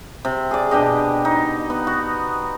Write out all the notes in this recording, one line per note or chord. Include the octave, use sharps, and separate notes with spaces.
C3
G#4 D5
B2 D4 G4 D#5
D#4
B3
F#4